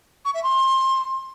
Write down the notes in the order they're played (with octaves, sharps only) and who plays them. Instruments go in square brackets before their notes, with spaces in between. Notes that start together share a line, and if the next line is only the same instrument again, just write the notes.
[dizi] C#6
E5
C6